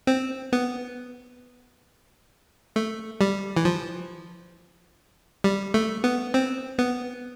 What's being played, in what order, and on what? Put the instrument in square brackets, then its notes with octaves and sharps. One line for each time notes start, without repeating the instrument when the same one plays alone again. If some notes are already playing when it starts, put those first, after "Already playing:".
[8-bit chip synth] C4
B3
A3
G3
E3
F3
G3
A3
B3
C4
B3